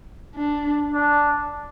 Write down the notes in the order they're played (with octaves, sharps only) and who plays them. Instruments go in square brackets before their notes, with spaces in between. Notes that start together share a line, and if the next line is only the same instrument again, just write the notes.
[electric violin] D4
[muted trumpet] D4